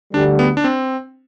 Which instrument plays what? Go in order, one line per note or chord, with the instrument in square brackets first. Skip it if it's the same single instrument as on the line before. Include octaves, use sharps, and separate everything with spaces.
[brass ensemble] D2 D3 G3 [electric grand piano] D4
[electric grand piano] B3
D4
C4